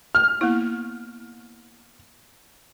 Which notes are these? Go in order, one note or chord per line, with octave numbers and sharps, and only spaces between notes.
F6
A#3 B3 E4